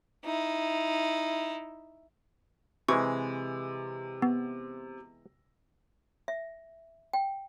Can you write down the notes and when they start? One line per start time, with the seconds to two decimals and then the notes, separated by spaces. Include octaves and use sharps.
0.25 D#4 E4
2.88 C3 E3 G#3 C#6
4.22 B3
6.28 E5
7.13 G5